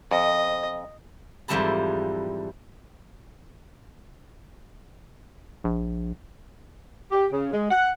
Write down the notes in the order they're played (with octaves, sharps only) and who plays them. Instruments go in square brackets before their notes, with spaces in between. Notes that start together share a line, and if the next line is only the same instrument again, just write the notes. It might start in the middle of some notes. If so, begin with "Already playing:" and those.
[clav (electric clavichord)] F2 [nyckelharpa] D#5
[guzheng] F2 G#2 E3 G3 A5 B5
[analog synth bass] A#1
[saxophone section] G4
C#3
G#3
F#5